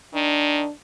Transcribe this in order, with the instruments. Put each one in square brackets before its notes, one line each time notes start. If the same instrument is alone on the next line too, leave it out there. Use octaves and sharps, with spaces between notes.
[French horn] D#3 [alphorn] D4